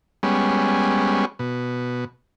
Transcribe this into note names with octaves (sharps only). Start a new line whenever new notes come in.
G3 G#3 B3 C#4
B2